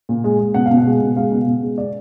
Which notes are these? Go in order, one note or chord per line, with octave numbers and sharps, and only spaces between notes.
A#2
G#3
G#3
B2 F#5
F5
B2
F#5
G#3
B2
G#3 F5
B2
B2
G#3
D5